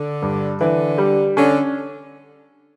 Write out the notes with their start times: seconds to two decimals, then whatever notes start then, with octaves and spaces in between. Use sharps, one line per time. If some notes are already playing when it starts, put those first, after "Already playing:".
Already playing: D3
0.22 G2
0.60 D3 E3
0.98 G3
1.36 D3 C#4